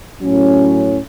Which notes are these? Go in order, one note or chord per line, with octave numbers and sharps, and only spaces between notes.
A2 F#3 C#4